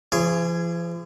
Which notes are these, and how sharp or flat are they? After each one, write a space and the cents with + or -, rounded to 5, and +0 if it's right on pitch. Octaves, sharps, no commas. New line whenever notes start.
F3 -45 G#4 +0 C#5 +0